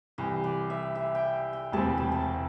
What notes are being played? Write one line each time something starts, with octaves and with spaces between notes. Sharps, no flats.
C2 C3 E3 G5
D5
E5
E5
G5
G5
E1 D2 C3 E3 C4 A5
A5
A5